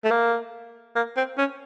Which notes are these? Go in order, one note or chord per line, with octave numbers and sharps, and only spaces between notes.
A3
A#3
A#3
C4
C#4